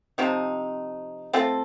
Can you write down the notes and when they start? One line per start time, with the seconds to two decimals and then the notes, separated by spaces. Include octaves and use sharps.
0.18 C3 F3 C4 D#4
1.33 A3 C4 F4 A4